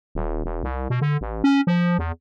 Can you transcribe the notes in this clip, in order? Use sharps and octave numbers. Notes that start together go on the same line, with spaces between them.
D#1
E1
C2
B2
D3
A1
C#4
F3
E2